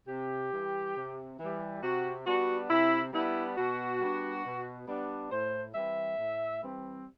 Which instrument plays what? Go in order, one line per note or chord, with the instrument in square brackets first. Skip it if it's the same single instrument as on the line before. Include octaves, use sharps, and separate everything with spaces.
[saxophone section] C3 G4
E3 G3
C3
E3 G3
C3 F#4
G3 B3 D4 F#4
C3 E4
G3 B3 D4 E4
B2 F#4
G3 B3 D4
B2
G3 B3 D4
A2 C5
E3 G3 C4 E5
A2
E3 G3 C4